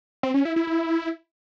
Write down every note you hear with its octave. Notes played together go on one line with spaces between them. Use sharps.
C4
C#4
E4
E4
E4